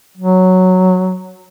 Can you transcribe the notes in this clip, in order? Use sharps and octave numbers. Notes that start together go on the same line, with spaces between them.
F#3